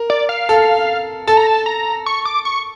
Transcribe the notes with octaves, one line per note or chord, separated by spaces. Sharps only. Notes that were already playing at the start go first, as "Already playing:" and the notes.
Already playing: A#4
D5
F5
A4
A4 A5
A#5
A5
A#5
C#6
D6
C#6